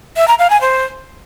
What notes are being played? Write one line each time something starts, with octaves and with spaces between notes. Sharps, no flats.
E5
A#5
F5
G#5
C5